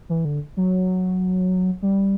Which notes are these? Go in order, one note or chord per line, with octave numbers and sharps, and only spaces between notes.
E3
D3
F#3
G3